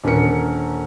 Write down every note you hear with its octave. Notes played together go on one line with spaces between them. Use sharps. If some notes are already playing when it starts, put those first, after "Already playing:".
D#1 D3 C#4 A#4 C#7